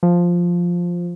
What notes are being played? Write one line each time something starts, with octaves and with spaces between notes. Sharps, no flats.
F3